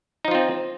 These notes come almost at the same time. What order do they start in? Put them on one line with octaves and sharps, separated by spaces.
D#4 F3 F4 C4